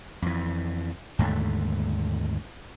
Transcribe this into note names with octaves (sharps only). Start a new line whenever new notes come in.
F2 E3
D#2 G#2 D3 A3